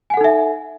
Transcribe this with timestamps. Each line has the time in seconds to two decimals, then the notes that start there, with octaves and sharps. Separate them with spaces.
0.10 G#5
0.14 F#5
0.17 A4
0.21 D#4
0.24 E5